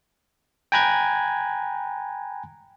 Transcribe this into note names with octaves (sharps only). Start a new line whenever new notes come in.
G5 G#5 A#5 B5 F#6 G#6